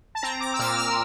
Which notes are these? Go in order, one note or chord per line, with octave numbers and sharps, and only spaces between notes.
A5
C4 A#5
D6
E6
A#2 F6
E6